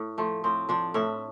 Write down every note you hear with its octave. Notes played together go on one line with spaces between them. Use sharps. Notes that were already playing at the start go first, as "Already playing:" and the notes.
Already playing: A2
F3 A3
A2 C4
F3 D4
A2 E4